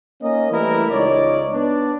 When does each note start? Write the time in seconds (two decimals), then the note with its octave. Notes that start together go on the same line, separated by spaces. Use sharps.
0.22 A#3 C#4 D#4 D#5
0.52 E3 G3 A3 E4 A#4
0.90 C#2 D#4 C#5 D5
1.52 B3 D4